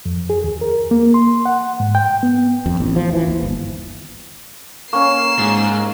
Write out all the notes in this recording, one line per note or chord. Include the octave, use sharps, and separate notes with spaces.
F2
G#4
D#2
A#4
A#3
C6
F#5
G#2
G5
B3
F2
A1
F3
E3
D#2
G1
A#3 C#4 C#6 C7 E7
G#2